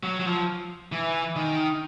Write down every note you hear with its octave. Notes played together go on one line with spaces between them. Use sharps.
F#3
F#3
F3
E3
D#3